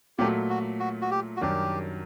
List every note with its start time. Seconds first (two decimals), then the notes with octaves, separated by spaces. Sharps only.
0.19 A#2 F#3 A3 G4
0.50 F#4
0.80 F#4
1.02 F#4
1.11 G4
1.37 F#4
1.41 F#2 D#3 G3 D4 G4